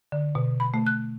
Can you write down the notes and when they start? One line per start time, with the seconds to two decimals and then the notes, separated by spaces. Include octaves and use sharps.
0.12 D3
0.35 B2
0.60 B5
0.74 A3
0.87 F#6